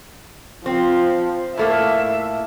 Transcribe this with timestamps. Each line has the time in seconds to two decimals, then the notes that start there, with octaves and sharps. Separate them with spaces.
0.66 F3 C4
1.57 A2 A3 A#3 E5